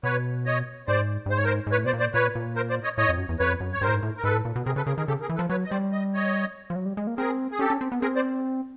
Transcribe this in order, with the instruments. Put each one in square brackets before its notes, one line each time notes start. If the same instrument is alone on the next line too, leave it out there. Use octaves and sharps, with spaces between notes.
[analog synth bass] B2 [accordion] B4 C#5
[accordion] C#5 D#5
[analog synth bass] G#2 [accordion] C5 D5
[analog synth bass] G2
[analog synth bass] G#2 [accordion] C5
[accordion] C#5
A#4 C5
[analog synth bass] G#2
[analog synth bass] A2 [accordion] B4 C#5
[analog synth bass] B2 [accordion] C5 D5
[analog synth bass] A#2
[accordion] C5 D5
[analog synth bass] A#2 [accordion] B4 C#5
[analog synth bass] A#2
[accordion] A#4 C5
C5 D5
C#5 D#5
[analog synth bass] A2 [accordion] C#5 D#5
[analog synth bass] F2
F#2
E2
[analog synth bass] F2 [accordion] B4 C#5
[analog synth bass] F#2
[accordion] C#5
[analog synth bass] G2 [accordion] A#4 C5
[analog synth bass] A2
G#2
A2
[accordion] A#4
[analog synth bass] G#2 [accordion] A4 B4
[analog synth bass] A2
A#2
B2
[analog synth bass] C3 [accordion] G#4 A#4
[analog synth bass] C#3 [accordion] A4 B4
[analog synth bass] C#3 [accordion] G#4 A#4
[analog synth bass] D#3 [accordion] G#4 A#4
[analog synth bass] C#3 [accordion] G4 A4
[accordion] G#4 A#4
[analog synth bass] E3
[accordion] A4 B4
[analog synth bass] F3
[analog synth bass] F#3 [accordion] B4 C#5
[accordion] D#5
[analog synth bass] G3 [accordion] C5 D5
[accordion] D#5
C#5 D#5
[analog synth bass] F3
F#3
G3
G#3
A#3
[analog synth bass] C4 [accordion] G#4 A#4
[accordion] G#4
[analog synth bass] C#4 [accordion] G4 A4
[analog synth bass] C#4
C4
B3
[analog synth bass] C4 [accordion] G#4 A#4
[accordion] C5 D5